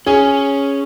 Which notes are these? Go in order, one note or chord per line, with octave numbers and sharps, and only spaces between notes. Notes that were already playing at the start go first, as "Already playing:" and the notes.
C#4 G#4 G#5